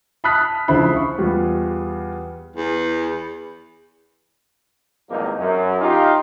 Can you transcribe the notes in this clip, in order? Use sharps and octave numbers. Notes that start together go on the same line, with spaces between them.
A5 B5 D#6 F6 F#6 B6
C#2 D3 F3 E4 C5 B5
C#6
E2 G3 F4
E2
G#1 E2 F3 G3 A#3 D#4
F#2
D#4 F4 G4